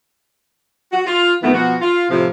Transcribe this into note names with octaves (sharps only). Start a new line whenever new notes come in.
F#4
F4
F2 D#3 E3 A3 B3
B2 F3 F#4
F4
A2 C3 F3